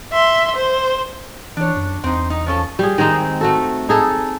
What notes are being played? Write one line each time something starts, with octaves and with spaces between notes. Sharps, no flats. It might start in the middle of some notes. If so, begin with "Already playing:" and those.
E5 C6
C5
E3 D4 C#5
F#2
E2 C4 D#4
D#4
F3 C#4 A4
G3 G#4
D#3 G#3 C4 D#4
A3 F#4 A4
D#4 G#4 A4